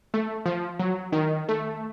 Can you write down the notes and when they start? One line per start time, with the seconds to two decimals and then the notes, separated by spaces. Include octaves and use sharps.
0.14 A3
0.46 F3
0.79 F#3
1.12 D#3
1.49 A3